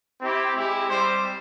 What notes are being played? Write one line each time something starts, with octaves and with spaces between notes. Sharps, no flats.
C4 E4 G4
G#3 E4 G4
G3 C4 G4 C5